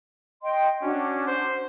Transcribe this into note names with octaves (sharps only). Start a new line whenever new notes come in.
D#5 G5 C6
C#4 D4 F#4
C5